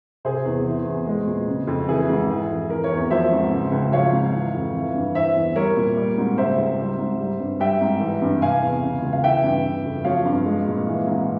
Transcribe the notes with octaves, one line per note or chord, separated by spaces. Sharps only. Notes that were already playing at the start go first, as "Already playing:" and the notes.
C3 G#4 C5
E2
E3
E2
G#3
A#2
C#3
F2
E3 G#4
G#2
E3
F2
E3 A#4
A#4 C#5
E2
A#4
F3 C5 E5
G#2
C#3
C#2
F3 C#5 F5
G#2
E3
F2
E3
G2
E3 C5 E5
E2
G3 A#4 C#5
A#2
G3
G#2
C#3 C5 E5
C#2
G3
G#2
G3
G2
G3 E5 G5
G#2
E3
G2
C3 F5 G#5
E2
C#3
C#2
F5
E3 E5 G5
G2
C#3
F2
F3 C#5 F5
G2
G#3
A#2
E3
G#2